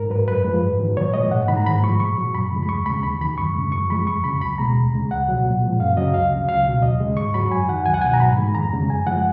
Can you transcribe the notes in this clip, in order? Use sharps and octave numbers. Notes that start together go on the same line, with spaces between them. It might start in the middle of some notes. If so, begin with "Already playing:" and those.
Already playing: G#2 A#4
F#3 B4
F#2 B4
F3 G#3
G#2
D#3 F#3
A#2 C#5
F3 G#3 D#5
G#2 F#5
D#3 G#3 B5
A#5
G#2 B5
F3 G#3 C#6
A#2 C#6
F#3
F#2 B5
C#3 F3 G#3
B5
D#2 C#6
C#3 G#3 B5
D#2 B5
D#3 F#3 B5
F#2 C#6
C#3 G#3
F#2 C#6
F3 G#3 B5
F2 C#6
C#3 F#3 B5
C#2 B5
B2 G#3 A#5
D#2
C#3 G#3
C#2 F#5
B2 F#3
A#2
F3 G#3
F#2 F5
C#3 F#3 D#5
C#2 F5
C#3 F#3
C#2 F5
B2 F#3
D#2 D#5
C#3 G#3
G#2 C#6
F#3 B5
F#2 G#5
D#3 F#3 F#5
C#2 G#5
F#5
B2 F#3 G#5
A#5
G#2 B5
D#3 G#3
F2 A#5
C#3 G#3
F#2 G#5
F3 G#3 F#5